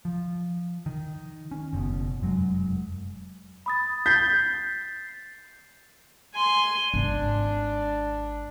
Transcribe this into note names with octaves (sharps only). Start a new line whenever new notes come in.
F3
D#3
C#4
F#1 B2
F1 F#2 F#3 G#3
B5 D#6 A6
G6 A6 B6 C7
G#5 C6
G#1 D4